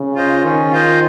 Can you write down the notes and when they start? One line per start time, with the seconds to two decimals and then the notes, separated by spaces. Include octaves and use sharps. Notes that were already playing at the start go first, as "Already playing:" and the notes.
Already playing: C#3
0.15 F4 C5 D#5
0.44 D#3 C#4
0.72 F4 C5 D#5